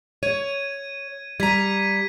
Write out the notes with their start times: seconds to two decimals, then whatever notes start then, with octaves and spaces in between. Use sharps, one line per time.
0.23 C#5 G#6 D#7
1.40 G3 A#5 G#6 B6 D#7